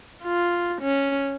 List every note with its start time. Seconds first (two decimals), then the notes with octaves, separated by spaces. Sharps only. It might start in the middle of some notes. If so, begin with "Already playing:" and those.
0.24 F4
0.81 C#4